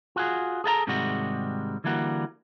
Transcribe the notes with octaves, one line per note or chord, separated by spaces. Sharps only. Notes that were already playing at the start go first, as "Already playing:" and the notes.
F4 F#4 G#4
G#4 A4 E5 A#5
G#2 C3 D#3 G3 G#3 F#4
D3 E3 G3 A#3 F#4